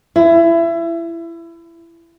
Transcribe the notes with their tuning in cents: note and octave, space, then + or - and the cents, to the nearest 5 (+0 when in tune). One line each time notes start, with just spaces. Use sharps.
E4 +25